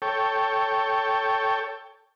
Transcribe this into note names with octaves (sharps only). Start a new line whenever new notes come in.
A4 C#5 G5